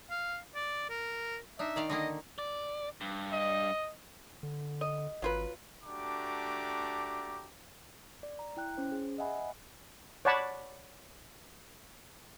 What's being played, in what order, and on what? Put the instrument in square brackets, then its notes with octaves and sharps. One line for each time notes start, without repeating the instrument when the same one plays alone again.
[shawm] F5
D5
A#4
[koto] D4 D#4 [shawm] E5
[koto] D#3 D5 F5
[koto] D3 D#3 A#3 [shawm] D#5
[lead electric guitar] D5
G2
[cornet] D#5
[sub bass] D3
[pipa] D#5
[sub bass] G#1 [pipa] F#3 F4 B4
[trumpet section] A3 D4 F#4 G4 A#5 D6
[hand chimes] D5
A#5
E4 G5 F#6
C#4 C5
G#4
D#5 E5 F#5 G#5 B5
[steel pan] C#5 D5 F#5 A5 B5